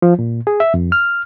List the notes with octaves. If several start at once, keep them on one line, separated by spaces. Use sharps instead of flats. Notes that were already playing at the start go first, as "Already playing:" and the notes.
F3
A#2
G#4
E5
F2
F6